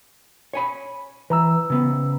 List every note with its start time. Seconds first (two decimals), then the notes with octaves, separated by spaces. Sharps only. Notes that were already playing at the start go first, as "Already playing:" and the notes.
0.53 C#5 G#5 B5
1.30 E3 B4 A#5 E6
1.70 C#3 B3